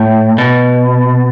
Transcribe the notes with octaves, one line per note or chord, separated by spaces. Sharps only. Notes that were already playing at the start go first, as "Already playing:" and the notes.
Already playing: A2
B2